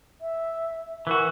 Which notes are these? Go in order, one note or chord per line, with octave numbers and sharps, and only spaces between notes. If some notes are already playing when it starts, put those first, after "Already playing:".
E5
E3 F#4 A#4